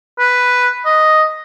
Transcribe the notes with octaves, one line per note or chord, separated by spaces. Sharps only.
B4
D#5